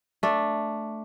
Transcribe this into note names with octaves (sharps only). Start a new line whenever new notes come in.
A3 D4